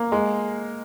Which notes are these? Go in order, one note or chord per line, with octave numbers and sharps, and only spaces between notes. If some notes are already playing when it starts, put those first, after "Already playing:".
Already playing: A#3
G#3